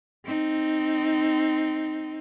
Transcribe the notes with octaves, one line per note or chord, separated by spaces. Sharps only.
C4 D#4